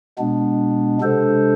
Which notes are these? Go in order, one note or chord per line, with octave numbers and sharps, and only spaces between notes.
B2 G#3 B3 D4
C3 G#3 D4 A4 C5